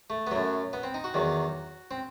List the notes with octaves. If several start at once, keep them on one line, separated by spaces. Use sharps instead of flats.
A3
B3
F#2 F#3 A3
B3
C4
D#4
F#4
E2 D#3 F#3
C4